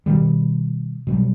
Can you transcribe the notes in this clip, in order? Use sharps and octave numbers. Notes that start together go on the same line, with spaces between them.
B2 D#3 G3
B2 F#3 G3